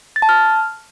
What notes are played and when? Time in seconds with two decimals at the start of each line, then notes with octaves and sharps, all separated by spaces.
0.16 A6
0.22 A5
0.29 F6